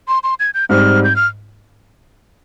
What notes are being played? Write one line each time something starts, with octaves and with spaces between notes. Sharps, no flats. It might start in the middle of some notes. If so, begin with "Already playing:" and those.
C6
C6
G#6
G6
G#2 G3 C4 F6
G6
F6